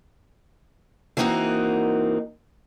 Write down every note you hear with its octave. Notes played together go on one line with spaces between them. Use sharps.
E3 A#3 C4 D#4 F#4 A#4